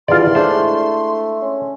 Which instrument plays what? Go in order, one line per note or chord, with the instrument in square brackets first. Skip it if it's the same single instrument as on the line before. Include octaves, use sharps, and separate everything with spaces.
[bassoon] E2 [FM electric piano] D#3 E3 G3 [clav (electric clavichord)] F4 D5 [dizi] C6
[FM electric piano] G#3 D4 E4 [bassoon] A3 [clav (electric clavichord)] C5
[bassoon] C#4